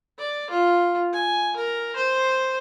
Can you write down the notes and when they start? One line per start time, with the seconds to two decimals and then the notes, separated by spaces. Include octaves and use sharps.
0.18 D5
0.50 F4
1.13 G#5
1.57 A#4
1.96 C5